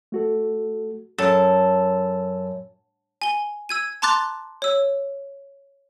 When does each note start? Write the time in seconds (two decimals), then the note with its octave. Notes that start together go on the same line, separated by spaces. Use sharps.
0.12 A3 F#4 A4
1.18 F#2 A4
3.22 G#5 G7
3.69 E6 G#6 D#7
4.02 A5 A#5 C6 D6 F#6 A6
4.62 C#5 E6